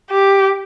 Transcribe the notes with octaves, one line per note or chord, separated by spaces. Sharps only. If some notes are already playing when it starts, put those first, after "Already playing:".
G4